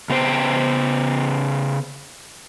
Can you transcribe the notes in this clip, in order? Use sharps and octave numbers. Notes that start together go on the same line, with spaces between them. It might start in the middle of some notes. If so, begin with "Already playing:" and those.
C#3 B3 C5 G5